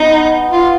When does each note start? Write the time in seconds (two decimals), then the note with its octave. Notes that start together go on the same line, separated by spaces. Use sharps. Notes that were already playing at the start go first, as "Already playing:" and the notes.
Already playing: B3 D#4
0.51 F4